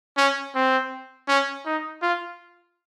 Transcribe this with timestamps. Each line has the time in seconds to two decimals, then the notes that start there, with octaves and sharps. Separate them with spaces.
0.17 C#4
0.55 C4
1.28 C#4
1.66 D#4
2.02 F4